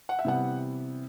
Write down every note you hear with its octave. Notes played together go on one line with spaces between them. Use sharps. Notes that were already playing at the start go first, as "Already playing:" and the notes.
F#5
E5
C3 E3 G3 B3 F#5